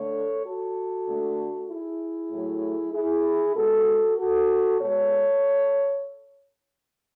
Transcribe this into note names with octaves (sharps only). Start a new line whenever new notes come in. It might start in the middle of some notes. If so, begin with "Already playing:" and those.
Already playing: D3 A3 A4 C#5
F#4 A4
D3 A3
E4 G#4
A2 F#3 A3
E4 G#4
B2 G#3 F#4 A4
F#4 A4
B2 G#3 A4 C#5